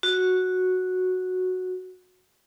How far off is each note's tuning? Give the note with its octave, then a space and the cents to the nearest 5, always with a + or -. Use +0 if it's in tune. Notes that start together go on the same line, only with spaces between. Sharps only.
F#4 -5